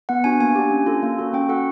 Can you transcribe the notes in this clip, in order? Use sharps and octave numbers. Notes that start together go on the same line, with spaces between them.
B3 F#5
D4 F#4 G#5
A#3 G#5
D4 G4
C#4
F4 A4
A#3
C#4 F#4 A4
C#4 G5
F#4 A4 F#5